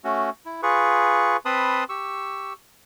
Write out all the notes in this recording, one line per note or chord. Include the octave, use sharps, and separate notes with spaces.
A3 C#4 F#4
E4
F4 G#4 B4 C#6
C4 B4 A5 B5 C6 D#6
G4 C#6 E6